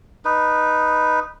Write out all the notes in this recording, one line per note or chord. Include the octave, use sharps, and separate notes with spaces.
D#4 B4